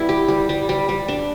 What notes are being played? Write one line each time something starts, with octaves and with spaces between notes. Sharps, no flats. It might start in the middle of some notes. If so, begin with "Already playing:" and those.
Already playing: G3 B3 E4
G4
G3
G3
G3
G3
D4